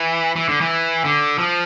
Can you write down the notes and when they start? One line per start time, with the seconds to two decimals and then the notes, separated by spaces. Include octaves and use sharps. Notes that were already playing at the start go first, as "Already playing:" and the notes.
Already playing: E3
0.36 E3
0.49 D3
0.61 E3
1.04 D3
1.38 F3